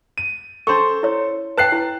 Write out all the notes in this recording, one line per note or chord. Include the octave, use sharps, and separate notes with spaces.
D#7
C#4 A4 C5 C6 C#6
E4 C#5
B4 G5 A5 F#6 C7
E4